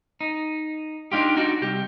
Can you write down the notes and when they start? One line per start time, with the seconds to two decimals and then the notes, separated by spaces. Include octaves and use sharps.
0.21 D#4
1.12 D4 D#4 F4 G4
1.37 D4 D#4 F#4
1.62 C2 G4